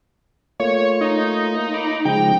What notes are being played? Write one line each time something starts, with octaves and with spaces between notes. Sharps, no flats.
A3 A#3 F4 C#5
D#4
A#5 B5 D6
C#3 F3 G#3 G5